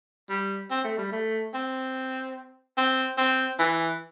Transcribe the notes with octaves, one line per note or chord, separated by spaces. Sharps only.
G3
C4
A3
G3
A3
C4
C4
C4
E3